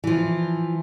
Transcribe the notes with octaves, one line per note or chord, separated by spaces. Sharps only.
E3 F3